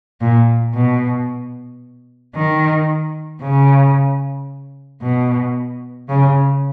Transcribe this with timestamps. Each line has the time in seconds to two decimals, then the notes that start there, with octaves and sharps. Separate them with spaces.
0.21 A#2
0.74 B2
2.35 D#3
3.42 C#3
5.02 B2
6.08 C#3